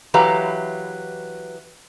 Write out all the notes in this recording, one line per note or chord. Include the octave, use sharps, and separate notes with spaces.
E3 F#3 G4 B4 F5 A#5